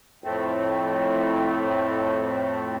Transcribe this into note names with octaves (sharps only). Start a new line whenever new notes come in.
F2 A2 A3 C4